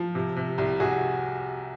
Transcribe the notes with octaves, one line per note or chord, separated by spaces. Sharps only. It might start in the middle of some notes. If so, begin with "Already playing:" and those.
Already playing: F3
C3
C3
C2
C3 F#4 G#4